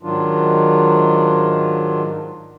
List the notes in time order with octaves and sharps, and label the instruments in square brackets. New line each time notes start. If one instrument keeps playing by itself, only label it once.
[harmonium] G#2 D#3 F#3 D4 F4